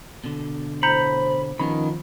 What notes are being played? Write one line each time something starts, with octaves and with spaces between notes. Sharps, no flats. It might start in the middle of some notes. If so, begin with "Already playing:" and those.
B2 D3
A2 C5 A#5 B5 G6 C#7
D#3 F3 B3 C#4 B5